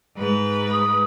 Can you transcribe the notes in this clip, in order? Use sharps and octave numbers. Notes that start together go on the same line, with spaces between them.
G#2 B4
D#6